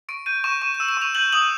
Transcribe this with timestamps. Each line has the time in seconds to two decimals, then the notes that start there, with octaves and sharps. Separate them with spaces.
0.09 C#6 D7
0.26 G6 D#7
0.44 C#6 E7
0.62 C#6 E7
0.74 E7
0.80 E6
0.89 E7
0.97 C#6 F7
1.15 G6 F#7
1.33 D#6 F#7